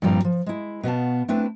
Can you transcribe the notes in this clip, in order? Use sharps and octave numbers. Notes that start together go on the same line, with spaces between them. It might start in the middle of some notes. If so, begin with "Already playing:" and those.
G2 A#2 F3 G3 C4 A#5
F3
G#3 E4
B2 B3 F5 A5
A3 C4 D4 E4 B4